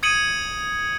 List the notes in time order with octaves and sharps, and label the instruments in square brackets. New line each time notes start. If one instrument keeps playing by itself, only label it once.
[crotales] D#6 G#6 C#7 D#7 F#7